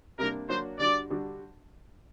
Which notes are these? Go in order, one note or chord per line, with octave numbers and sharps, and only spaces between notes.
C3 G3 A#3 D4 A#4
F#3 A#3 D4 F#4 C5
D3 G3 D4 F#4 D5
D3 G3 D4 F#4